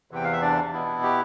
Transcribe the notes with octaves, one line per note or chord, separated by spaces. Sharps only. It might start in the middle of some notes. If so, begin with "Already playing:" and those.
E2 C3 E3 G5
F5
E5
D4 D5
B2 B3 E4
G4